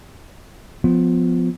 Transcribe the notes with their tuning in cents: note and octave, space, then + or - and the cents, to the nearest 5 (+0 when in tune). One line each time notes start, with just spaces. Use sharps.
F3 +15 B3 +25